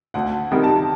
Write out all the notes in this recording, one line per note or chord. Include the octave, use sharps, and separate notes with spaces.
D2 F#5
C3 D#3 G3
A5